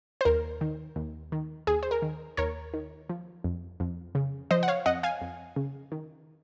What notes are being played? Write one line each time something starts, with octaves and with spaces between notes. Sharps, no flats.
C5
D#2 A#4
D#3
D#2
D#3
D#2 G#4
C5
A#4
D#3
D#2 A#4 C#5
D#3
F3
F2
F2
C#3
F3 C5 D#5
F#5
C#5 F5
F2 D#5 F#5
F5 G#5
F2
C#3
D#3